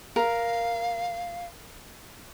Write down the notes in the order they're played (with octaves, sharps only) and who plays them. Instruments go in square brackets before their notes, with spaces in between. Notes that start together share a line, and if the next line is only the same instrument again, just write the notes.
[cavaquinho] A#4 [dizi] F5